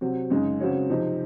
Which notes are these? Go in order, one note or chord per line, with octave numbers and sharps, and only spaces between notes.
C3 F#3 C4 F#4
F#2 C#3 G#3 D#4
C#3 F#3 C4 F#4 C#5
C3 F3 C4 D#4